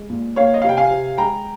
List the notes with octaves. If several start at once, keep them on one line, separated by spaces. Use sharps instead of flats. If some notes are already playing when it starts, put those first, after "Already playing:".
Already playing: G#3
A#2
A#3 C#5 F5
D#5
C3 F5
G5
F5 G#5
C3
G#3 G5 A#5